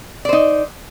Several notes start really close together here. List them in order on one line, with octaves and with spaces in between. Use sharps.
D5 C5 D#4